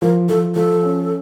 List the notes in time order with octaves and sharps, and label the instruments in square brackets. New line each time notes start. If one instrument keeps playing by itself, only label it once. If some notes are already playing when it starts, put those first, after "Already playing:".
[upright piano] F3 [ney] A#4
[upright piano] F3 [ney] A4
[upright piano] F3 [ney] A4
[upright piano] C#4